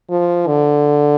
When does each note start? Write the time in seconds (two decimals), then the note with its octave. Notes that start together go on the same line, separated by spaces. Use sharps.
0.10 F3
0.47 D3